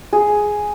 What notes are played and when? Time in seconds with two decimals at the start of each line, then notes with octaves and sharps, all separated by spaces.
0.13 G#4